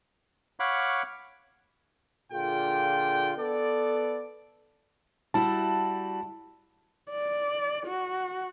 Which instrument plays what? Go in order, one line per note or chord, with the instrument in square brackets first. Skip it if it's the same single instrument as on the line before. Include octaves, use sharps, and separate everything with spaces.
[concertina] C#5 F5 F#5 B5 C#6 D6
[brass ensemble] A#2 D3 F4 G#4 G5
B3 A4 D5
[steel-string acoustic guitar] G3 E4 F#4 [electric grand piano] A5
[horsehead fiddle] D5
F#4